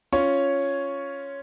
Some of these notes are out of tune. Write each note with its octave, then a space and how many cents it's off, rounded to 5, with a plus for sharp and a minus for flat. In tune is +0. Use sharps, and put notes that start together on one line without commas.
C#4 +0 F4 +0 C#5 +0